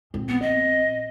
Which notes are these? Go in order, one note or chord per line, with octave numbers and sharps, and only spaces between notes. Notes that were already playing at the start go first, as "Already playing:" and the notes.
A#1 C4
B3
D#5